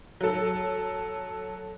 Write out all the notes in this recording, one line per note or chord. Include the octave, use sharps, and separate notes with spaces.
F#3 A4